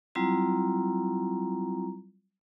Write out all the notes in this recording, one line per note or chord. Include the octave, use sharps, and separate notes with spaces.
F#3 G3 C4 E4 F4 A#5